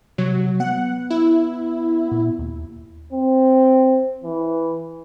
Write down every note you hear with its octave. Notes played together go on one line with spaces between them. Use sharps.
C3 F#3
B3 F#5
E4
A#2
D#2
C4
E3